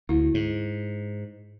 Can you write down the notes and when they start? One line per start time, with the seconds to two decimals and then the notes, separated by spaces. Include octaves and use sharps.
0.09 D2 E4
0.34 G#2